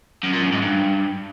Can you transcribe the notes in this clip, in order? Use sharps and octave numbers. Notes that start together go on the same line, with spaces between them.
F#2
A#2
F#2
G#2
G2